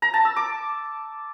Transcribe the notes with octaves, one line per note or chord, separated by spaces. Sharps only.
A#5
A5
E6
D6